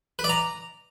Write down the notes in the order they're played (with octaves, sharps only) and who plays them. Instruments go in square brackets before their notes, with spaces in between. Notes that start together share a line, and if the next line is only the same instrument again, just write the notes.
[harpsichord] B4
D5
A#5